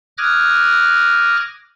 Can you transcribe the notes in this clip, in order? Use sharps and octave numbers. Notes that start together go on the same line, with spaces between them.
D6 D#6 F6 F#6 G#6 A#6